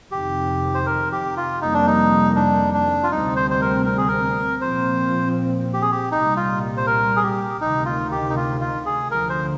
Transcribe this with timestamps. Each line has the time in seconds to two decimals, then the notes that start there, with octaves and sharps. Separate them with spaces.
0.11 F2 C3 D#3 G4
0.75 C5
0.86 A#4
1.12 G4
1.37 F4
1.61 F2 C3 D#3 G3 A#3 D#4
1.74 D4
1.87 D#4
2.36 D4
2.74 D4
3.03 F4
3.11 D2 C3 G3 C4 D#4
3.36 C5
3.50 C5
3.61 A#4
3.86 A#4
3.97 G#4
4.08 A#4
4.61 A#2 F3 C4 C5
5.74 G4
5.82 G#4
5.92 G4
6.10 C2 A#2 G3 D#4
6.37 F4
6.77 C5
6.87 A#4
7.16 G#4
7.23 G4
7.61 D2 C3 D#3 D#4
7.85 F4
8.11 G4
8.29 D#4
8.36 F4
8.60 F4
8.86 G#4
9.10 D2 D3 F3 A#4
9.29 C5